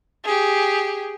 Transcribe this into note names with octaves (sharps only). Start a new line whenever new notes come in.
G4 G#4